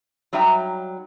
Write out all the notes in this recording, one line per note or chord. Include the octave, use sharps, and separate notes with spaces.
F#3 G3 D#4 E5 G5 A#5